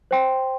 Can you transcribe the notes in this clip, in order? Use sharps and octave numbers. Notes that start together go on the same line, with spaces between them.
C5 G5 C6